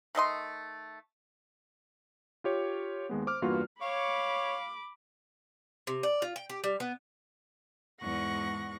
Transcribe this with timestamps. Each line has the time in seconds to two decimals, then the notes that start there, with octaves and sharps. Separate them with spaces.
0.15 D#3 A3 D#5 C6
2.44 F4 G4 C#5
3.09 D#2 G#3 B3
3.27 C5 D6 F6
3.42 E2 G2 A#3 F4 F#4 B4
3.82 C#5 F5 B5 D6
5.87 C3
6.03 D5
6.22 F4
6.36 G5
6.50 G4
6.64 G3
6.80 B3
8.01 E2 G#2 F#5 C#6 A#6